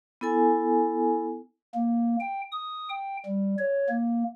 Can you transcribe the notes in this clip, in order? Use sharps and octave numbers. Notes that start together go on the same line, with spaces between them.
B3 E4 A4 G#5
A#3
G5
D#6
G5
G3
C#5
A#3